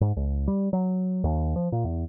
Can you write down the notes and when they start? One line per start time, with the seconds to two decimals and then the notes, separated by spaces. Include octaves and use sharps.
0.01 G#2
0.17 C#2
0.48 G3
0.73 F#3
1.24 D#2
1.56 F3
1.72 A#2
1.84 E2